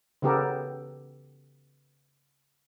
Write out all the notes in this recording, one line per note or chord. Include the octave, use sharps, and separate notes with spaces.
C#3 E3 B3 G4 A4 A#4